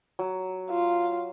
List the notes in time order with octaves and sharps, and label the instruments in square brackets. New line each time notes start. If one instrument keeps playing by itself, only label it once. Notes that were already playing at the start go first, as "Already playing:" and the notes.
[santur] F#3
[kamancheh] F4